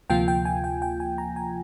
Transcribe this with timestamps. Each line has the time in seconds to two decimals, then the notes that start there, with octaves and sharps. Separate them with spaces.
0.10 D2 C3 F3 A#3 F4 G5
0.28 G5
0.45 G#5
0.64 G5
0.82 G5
1.00 G#5
1.18 A#5
1.36 G#5